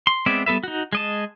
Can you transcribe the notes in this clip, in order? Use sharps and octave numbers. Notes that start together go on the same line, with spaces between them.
C6
G#3 B3 C4 D5 E5
G3 B3 A4 B4 E5
D#4 F#4
G#3 D#5 A5